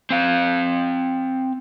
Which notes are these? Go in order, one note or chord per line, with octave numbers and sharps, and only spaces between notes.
C4 F5